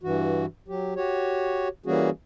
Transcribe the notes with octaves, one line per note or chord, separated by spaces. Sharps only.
G2 E3 F#4
F#3 G4
F#4 G4 C#5
E3 G3 A#3 C#4 F#4 G#4